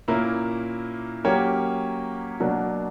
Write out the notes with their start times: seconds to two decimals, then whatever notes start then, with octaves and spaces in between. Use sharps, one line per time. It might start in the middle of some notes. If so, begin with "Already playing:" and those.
0.08 A#2 A#3 C#4 E4
1.24 F#3 A#3 C#4 G4 C#5
2.40 B2 F#3 A#3 D4